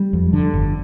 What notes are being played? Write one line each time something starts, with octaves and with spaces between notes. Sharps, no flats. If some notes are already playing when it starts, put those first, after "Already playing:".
Already playing: G3
F2
D3
G1